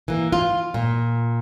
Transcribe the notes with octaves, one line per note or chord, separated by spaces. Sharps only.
E3 A#3
F4
A#2